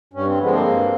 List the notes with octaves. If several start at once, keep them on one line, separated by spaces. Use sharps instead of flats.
G2 C#4
C4
D3 F3 G#3 B3
A#3 C4
G2